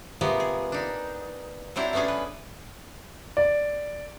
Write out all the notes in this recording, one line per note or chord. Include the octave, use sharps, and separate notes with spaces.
C3 F3 G#3 A#3 B3
G#4
D4 D#4
F#3 C4 D4 E4
A3 B3 C#4 D4 G#4
B4
D5